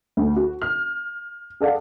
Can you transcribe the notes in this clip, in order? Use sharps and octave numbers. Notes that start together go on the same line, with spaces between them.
D2
F#4
F6
G#4 A4 D5 F5 F#5